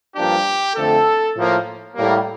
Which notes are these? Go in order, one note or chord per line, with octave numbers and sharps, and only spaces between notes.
G2 F3 A#3 D4 G4
F2 D3 A3 C4 A4
A2 F3 A#3
A2 G3 A#3